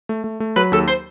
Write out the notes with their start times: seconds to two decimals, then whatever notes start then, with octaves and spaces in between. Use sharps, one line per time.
0.09 A3
0.24 A3
0.40 A3
0.56 F#3 B4
0.72 D#2 A4
0.88 C5